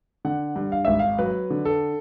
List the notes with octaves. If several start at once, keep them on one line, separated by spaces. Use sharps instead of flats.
D3 F#5
G2
F5
G#1 E5
F5
F#3 B4
D3
A4